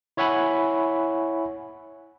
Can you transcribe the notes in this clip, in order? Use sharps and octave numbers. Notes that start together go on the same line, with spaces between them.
E4 C#5 E5 F#5 G#5 B5